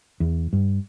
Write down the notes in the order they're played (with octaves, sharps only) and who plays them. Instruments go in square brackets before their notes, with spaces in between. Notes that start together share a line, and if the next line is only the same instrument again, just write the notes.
[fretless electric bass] E2
G2